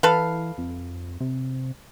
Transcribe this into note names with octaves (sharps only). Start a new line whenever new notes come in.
E3 A4 B4 F5
F2
C3